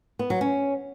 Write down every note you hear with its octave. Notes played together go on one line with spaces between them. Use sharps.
B3
F#3
C#4